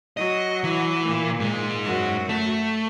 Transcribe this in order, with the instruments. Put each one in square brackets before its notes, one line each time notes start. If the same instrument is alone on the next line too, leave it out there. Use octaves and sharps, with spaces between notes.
[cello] F#3 F#4 [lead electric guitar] D#5
[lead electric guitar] E3
[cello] A#2
[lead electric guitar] G#2 G#3
[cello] F#2 F#4
[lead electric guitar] A3